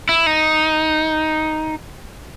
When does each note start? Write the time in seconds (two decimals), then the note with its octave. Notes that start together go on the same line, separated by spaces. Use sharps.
0.09 E4
0.27 D#4